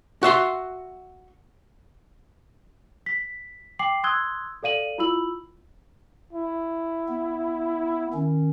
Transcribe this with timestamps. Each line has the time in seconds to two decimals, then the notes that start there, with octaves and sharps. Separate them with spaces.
0.23 F#4 E5 C6
3.06 B6
3.79 G5 D6 C7 F#7
4.04 C6 D#6 E6 F#6 G#6 G7
4.63 A4 D5 F5 D#7 F#7
4.98 E4 F4 B5 E6 F#7
6.33 E4
7.09 B3
8.14 D#3 C#4